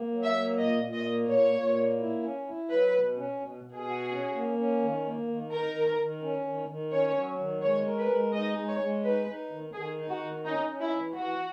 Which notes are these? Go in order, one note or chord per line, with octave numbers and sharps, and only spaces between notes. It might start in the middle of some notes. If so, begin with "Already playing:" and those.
Already playing: A#3
F#3
E5
A#3
A#2 D#5
A#2
D#5
A#3
A#2 C#5
A#2
A#3
E4
C#4
E4
F#3 B4
B2
C#4
B2
B2
G#4
F#4
C#4
A#3
C#4
D#3
A#3
D#3
D#4 A#4
D#3
D#3
C#4
D#3
D#3
C#4 C#5
F#3
D#3
G#3 C#5
A#4
B4
G#3
D#4 D#5
G#3
C#5
G#3
D#4 B4
D#4
D#3
D#3 G#4
D#4
F#4
D#3
C#4 D#4
C#4
E4
E3
E3 F#4